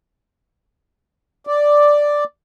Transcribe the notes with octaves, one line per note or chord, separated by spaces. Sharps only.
D5